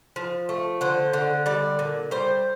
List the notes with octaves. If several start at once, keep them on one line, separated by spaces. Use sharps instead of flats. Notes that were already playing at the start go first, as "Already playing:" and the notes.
F3
A3
D3 C5
D3
G3 D5
A#2
G3 C5